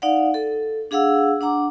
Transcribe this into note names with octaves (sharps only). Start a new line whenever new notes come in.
D#4 D5 F5 F#5
A4
D4 G#4 F5 F#5 E6
D4 F#5 A#5 D6